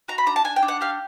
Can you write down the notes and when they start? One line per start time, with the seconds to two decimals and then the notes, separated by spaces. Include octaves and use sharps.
0.08 F#4 A#5
0.18 B5
0.26 D4 A#5
0.36 A5
0.44 D4 G#5
0.56 G5
0.62 D4
0.68 F#5
0.81 G4 F5